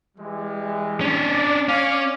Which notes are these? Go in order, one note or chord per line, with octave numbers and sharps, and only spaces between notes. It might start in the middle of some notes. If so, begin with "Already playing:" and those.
E3 G3 G#3
C#4 D4
D5
C#4 C#5 D5 F5